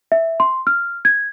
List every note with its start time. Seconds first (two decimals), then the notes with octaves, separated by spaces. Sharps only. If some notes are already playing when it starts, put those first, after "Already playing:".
0.12 E5
0.40 C6
0.67 F6
1.05 G#6